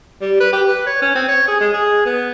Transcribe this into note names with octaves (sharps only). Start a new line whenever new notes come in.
G3
B4
G4
B4
C#5
C#4
C4
C#5
G#4
G#3
G#4
B3